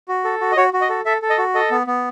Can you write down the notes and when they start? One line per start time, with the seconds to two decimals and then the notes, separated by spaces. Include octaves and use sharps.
0.08 F#4
0.25 A4
0.41 F#4
0.52 D#5
0.57 F#4 C#5
0.73 F#4
0.81 D#5
0.89 A4
1.06 A4 E5
1.22 A4
1.30 D#5
1.38 F#4
1.55 A4 D#5
1.71 B3
1.87 B3